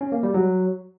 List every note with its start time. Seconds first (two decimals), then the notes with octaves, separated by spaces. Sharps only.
0.01 C#4
0.12 A#3
0.23 G3
0.34 F#3